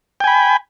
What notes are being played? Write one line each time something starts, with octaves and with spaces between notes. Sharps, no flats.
G5 G#5 B5